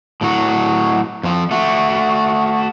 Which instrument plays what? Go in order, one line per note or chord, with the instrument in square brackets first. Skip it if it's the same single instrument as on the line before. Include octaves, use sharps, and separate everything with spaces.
[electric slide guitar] A2 F#3 F#4
F2 F3
A3 F#4